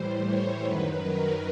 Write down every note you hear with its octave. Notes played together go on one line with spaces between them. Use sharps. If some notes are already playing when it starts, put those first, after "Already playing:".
Already playing: A2 E3 G3 C5
C#5
F#2 D#3 F#3 B4
A#4